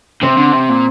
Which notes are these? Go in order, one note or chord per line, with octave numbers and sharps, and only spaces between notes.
C3 C4
D3
C3
A#2